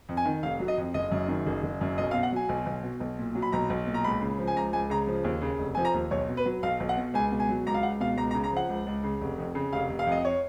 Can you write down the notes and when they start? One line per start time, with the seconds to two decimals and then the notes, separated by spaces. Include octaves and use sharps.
0.09 F2
0.17 G#5
0.25 D#3
0.43 F1 F5
0.60 F#3
0.68 D#5
0.78 F2
0.94 F#1 D#5
1.12 F#2
1.28 D#3
1.47 F#1
1.63 F#1
1.81 F#2
1.98 B1 D#5
2.11 F5
2.14 B2
2.23 F#5
2.32 F#3 G#5
2.49 B1
2.66 B1
2.83 B2
3.00 B1
3.19 A#2
3.35 F#3
3.42 B5
3.52 B1 A#5
3.70 B1
3.87 A#2
3.94 A#5
4.04 C#2 B5
4.21 C#3
4.38 F3
4.47 G#5
4.56 C#2 A#5
4.73 C#2 G#5
4.90 C#3 A#5
5.07 F3
5.24 D#2
5.42 C#3
5.59 F1
5.75 F3 G#5
5.85 A#5
5.94 D#2
6.11 B1 C#5
6.29 B2
6.37 B4
6.46 F#3
6.63 B1 F5
6.80 B1
6.89 F#5
6.97 B2
7.14 C#2 G#5
7.31 B2
7.40 G#5
7.49 F#3
7.66 C#2 A#5
7.74 F5
7.83 C#2 F#5
8.00 B2 F5
8.17 C#2 A#5
8.31 A#5
8.34 C#3
8.44 A#5
8.53 F3 F#5
8.69 C#2
8.87 C#2
9.04 C#3
9.21 F1
9.38 F2
9.55 C#3
9.73 F1 F5
9.89 F1
9.99 F5
10.07 F2 D#5
10.25 C#5